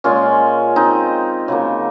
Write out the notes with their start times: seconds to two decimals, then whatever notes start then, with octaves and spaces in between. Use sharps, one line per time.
0.04 A#2 G#3 C#4 F4
0.76 C4 D#4
1.48 C#3 F#3 A#3